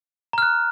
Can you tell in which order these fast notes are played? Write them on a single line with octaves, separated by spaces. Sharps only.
A#5 F6 F#6